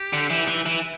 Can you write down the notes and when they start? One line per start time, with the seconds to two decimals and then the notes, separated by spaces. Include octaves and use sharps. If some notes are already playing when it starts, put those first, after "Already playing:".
Already playing: G4
0.13 D3
0.30 E3
0.48 E3
0.66 E3